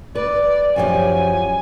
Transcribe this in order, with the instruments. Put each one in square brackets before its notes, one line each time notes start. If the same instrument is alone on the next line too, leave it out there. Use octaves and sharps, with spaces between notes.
[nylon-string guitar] B4 [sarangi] D5
[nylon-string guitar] F#2 F3 G4 [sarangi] G#5